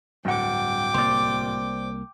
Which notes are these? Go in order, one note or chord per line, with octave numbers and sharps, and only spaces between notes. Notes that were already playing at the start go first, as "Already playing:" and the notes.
D1 G2 F#5 G5 D6
C2 A#3 C5 D5